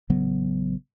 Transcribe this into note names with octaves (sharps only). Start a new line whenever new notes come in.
A1 C#3 F#3 B3